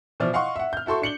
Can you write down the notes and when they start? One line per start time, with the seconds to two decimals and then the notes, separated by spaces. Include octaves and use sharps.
0.20 B2 E3 F3 D5 F6
0.33 D#5 F5 F#5 C6 C#6
0.56 E5 F#5
0.73 F6 G6
0.86 E4 F#4 A4 C6 C#6
1.02 D4 C#7 F#7 G7